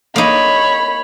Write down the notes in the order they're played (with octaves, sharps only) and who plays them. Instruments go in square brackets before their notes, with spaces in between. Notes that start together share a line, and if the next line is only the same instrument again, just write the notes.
[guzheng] A#3 D#4 [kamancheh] C#5 B5